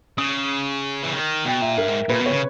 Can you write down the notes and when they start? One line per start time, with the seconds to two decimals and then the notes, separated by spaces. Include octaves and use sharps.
0.18 C#3 D#6
1.03 E3
1.13 D#3
1.45 B2 G5
1.61 A#2 E5
1.78 G2 A#4
1.88 G#2
2.09 A#2 B4
2.20 B2
2.26 C#5
2.31 C#3